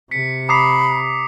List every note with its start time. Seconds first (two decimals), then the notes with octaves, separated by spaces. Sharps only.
0.11 C3 B6 C#7
0.49 A#5 B5 D6 D#6 B6 C7 F7